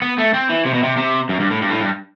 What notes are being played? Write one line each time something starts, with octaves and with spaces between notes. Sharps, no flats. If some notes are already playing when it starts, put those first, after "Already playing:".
B3
A3
C4
E3
C3
B2
C3
C3
F#2
G2
A2
G2
A2
G2